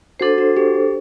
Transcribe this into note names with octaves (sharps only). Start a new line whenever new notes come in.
D4 F#4 A4 C5
F#4
G4